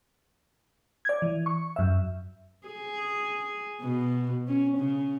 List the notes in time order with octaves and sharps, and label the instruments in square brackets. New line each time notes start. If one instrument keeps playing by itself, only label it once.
[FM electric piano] D5 G#6
E3
C#6
F#2 E5
[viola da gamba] G#4
B2
C#4
C#3